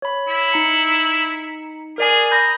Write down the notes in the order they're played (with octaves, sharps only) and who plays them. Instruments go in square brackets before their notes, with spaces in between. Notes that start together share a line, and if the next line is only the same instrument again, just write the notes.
[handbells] C#5 B5
[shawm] E4
[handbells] D#4 A#5 C#7
[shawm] G#4 [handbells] A#4 D5 G#5
[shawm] A#5 [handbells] B5 D#6 G6